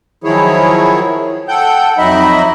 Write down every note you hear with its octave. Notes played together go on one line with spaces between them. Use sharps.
D#3 F3 F#3 E4 G#4 C#5
A4 F#5 G5 G6
F2 F#3 D#4 D#5 E5 B5